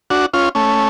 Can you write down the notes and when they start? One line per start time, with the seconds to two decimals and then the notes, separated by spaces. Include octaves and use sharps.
0.10 D4 F#4
0.34 C#4 F4
0.55 A3 C#4